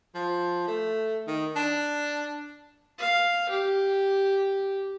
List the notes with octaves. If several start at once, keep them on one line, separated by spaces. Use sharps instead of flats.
F3
A3
D#3
D4
F5
G4